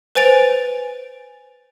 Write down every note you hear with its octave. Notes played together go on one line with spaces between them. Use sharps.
B4 C5 G#5 A6 D7 F7